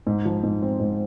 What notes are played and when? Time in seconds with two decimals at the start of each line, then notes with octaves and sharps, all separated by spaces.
0.07 G#2
0.25 F3
0.43 G#2
0.62 C4
0.80 G#2